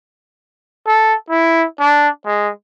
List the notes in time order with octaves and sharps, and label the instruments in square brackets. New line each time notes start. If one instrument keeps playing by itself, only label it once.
[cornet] A4
E4
D4
G#3